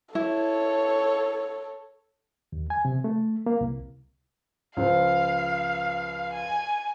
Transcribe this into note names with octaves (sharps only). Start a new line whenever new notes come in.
E4 A4 C#5
D#2
G#5
C3
A3
A#3
C2
C#2 F3 C5 F5
G#5